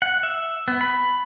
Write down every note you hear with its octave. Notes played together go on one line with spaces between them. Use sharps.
F#5
E5
B3
B5